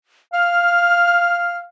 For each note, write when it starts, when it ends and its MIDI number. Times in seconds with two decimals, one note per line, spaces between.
0.33 1.67 77
0.33 1.58 89